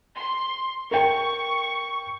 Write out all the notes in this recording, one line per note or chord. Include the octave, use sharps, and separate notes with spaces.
C6
A#4 G5 C#6